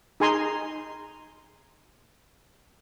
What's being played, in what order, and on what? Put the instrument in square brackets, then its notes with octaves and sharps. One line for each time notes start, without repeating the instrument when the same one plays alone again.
[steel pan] D#4 G#4 G#5 A#5 C6